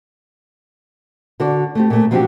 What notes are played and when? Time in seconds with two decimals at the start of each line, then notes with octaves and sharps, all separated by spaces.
1.40 D3 F#4 A4 D5
1.75 A3 C4 G4
1.90 A#2 A3
2.11 F3 F#3 C4 D4 F#4 G4